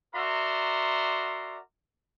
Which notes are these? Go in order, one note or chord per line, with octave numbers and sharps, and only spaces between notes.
F#4 A#4 D5 E5 A#5 C6